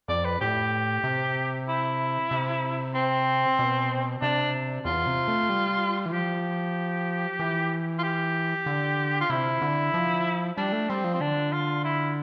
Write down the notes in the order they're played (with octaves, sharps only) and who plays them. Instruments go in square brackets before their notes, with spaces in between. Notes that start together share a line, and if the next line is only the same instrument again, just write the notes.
[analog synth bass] F2 [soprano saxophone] D5
[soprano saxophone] B4
[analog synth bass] A2 [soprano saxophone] G4
[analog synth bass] C3
[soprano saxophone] E4
[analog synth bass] C3
[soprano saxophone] C4
[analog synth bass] B2
[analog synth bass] C3 [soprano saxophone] D4
[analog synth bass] E2 [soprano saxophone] F4
[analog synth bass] C3
A3
G3
E3
[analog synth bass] F3 [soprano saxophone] G4
[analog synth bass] E3
[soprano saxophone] F4
G4
[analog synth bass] D3
[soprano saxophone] F4
[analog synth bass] C3 [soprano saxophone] E4
[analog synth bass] D3
F3
[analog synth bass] G3 [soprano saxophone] D4
[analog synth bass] A3
[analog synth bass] G3 [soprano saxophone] C4
[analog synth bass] F3
[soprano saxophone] C4
[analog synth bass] D3 [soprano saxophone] D4
[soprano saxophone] F4
E4